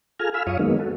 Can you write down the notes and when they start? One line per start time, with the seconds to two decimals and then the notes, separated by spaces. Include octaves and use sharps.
0.20 F4 G#4 A4 G#5 A#5 F6
0.34 F5 G#5 B5 E6 F6
0.47 F#2 F4 C#5 F5 C#6 D#6
0.59 D#3 F#3 G#3 A#3 B3 D#4
0.79 F#4 A4